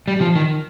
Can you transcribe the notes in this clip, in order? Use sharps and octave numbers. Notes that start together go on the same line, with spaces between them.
G3
F3
D#3